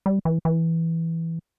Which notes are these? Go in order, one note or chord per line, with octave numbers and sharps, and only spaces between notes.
G3
E3
E3